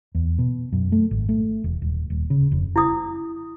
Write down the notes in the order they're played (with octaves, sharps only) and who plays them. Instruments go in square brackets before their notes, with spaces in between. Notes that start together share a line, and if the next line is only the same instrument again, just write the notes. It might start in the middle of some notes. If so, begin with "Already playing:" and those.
[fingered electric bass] E2
B2
F#2
A3
G#1
A3
E1
D#1
D#1
C#3
F1
[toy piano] E4 D#6